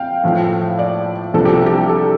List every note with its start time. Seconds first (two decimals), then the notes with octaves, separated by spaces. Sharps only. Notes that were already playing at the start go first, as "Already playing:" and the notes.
Already playing: F2 F5 G5
0.24 A2 F3 A3
0.79 D5
1.34 C2 C3 F3 D4 A4
1.45 G4
1.66 G4
1.89 A4